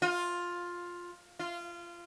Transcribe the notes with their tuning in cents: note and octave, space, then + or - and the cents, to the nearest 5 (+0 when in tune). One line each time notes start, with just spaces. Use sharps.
F4 +10
F4 -20